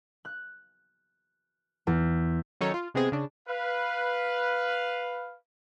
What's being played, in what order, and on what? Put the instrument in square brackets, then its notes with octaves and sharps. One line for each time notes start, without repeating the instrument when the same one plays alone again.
[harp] F#6
E2
[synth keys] D#3 F#3 C#4 D#4 A4 C#5
F4
C3 G#3 B3 C4 G#4
C#3 D4
[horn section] B4 F5